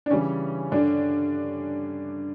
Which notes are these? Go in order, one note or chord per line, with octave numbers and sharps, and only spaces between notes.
D4
C#3 E3 G3 C#4
G2 D3 G3 D4